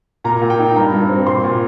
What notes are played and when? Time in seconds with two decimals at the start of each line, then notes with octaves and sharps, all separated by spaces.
0.24 A#2 A#5
0.42 A#2
0.50 G5
0.59 D#4
0.76 G2 A#5
0.92 G2
1.09 C4
1.26 A#2 C6
1.44 A#2